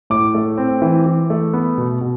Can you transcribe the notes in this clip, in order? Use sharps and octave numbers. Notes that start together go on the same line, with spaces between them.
A2 D6
A3
C4
E3
E3
A3
B3
B2
B2